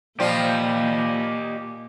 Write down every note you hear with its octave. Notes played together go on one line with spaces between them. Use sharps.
A#2 F3 G3 F4 G4 D#5